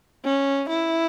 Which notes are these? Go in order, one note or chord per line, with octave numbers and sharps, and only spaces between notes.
C#4
E4